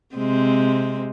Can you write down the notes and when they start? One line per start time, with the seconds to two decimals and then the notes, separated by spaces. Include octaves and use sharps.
0.15 C3 G#3 C4